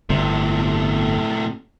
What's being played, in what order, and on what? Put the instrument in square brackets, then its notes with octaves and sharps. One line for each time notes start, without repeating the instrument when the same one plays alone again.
[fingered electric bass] G1 [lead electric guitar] A2 C3